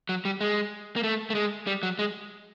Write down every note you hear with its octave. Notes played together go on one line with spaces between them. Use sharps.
F#3
G3
G#3
A#3
A3
A3
G#3
G3
F#3
G#3